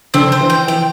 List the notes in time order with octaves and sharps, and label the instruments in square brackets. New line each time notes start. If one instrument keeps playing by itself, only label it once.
[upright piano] D3 [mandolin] C4
[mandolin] C5
[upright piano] E3
[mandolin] G5
[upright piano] E3 [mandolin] G5